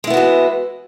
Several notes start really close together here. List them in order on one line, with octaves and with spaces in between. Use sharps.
G#3 E4 B3 F#4 E3